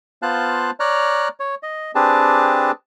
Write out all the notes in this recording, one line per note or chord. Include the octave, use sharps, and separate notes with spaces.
B3 F4 C5 F5 A5 F#6
C#5 D5 A#5 F6 F#6
C#5
D#5
C4 D4 G4 G#4 B4 A5